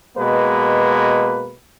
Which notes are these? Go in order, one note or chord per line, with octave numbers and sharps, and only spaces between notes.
B2 G#3 A#3 B4